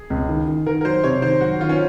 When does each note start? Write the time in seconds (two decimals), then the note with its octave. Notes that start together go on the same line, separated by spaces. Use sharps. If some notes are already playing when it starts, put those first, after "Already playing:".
Already playing: G#4
0.10 C#2
0.29 D#3
0.47 D#3
0.66 D#3 A#4
0.81 A#4
0.85 F#3 C5
1.04 C3 C#5
1.22 D#3 C5
1.41 F#3 F#4
1.60 D#3 F4
1.69 C#4